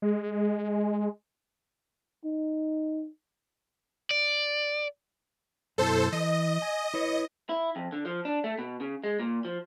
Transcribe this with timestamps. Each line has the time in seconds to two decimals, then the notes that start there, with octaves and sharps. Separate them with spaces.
0.02 G#3
2.25 D#4
4.11 D5
5.78 F#2 B2 E4 A4 C5
6.12 E3 D#5
6.62 G#5
6.94 E4 B4 C#5
7.49 E4
7.76 F2
7.92 D3
8.06 F3
8.25 D4
8.44 A3
8.59 B2
8.81 C#3
9.04 G#3
9.20 A#2
9.45 F3